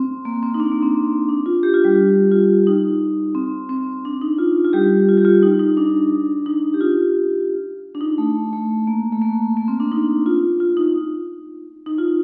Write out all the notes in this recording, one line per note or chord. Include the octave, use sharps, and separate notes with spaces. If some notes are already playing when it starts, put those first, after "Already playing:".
Already playing: C4
A#3
C4
D#4
D4
A#3
C4
D4
F4
G4
F4
G3 G4
F4
D#4
C4
C4
D4
D#4
F4
F4
G3 G4
F4
G4
F4
D#4
D#4
D4
D#4
G4
F4
D4
D#4
A3
A3
A#3
A3
A#3
A#3
C4
D4
D#4
F4
F4
D#4
D#4
F4